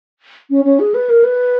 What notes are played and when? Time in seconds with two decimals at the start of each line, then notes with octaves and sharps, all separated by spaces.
0.50 C#4
0.65 C#4
0.79 G#4
0.94 B4
1.09 A#4
1.24 B4